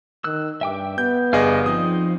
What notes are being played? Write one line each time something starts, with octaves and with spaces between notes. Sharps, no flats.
D#3 E6 F#6
G2 E5 G5 D6
B3 G6
G1 G4 G#4 D5 D#5 F5
F3 C4 D#4 D#6